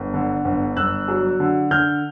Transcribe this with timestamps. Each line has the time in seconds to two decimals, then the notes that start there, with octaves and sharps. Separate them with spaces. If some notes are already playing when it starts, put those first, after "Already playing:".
Already playing: G1
0.14 D3
0.45 G1
0.76 G1 E6 F#6
1.08 F#3
1.40 D3
1.71 D3 F6 G6